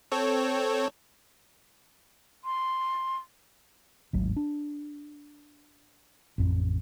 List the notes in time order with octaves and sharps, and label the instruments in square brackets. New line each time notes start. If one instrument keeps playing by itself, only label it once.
[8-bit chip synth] C4 A4 C#5
[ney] C6
[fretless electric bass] D1 G#1 F#3
D4
A1 F2